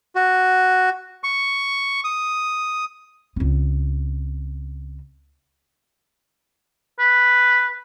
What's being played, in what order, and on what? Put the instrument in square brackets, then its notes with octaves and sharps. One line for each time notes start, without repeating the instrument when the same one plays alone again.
[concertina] F#4
C#6
D#6
[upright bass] C#2 C4
[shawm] B4